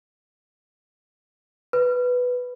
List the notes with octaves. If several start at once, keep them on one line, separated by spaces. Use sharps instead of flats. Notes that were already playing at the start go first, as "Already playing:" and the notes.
B4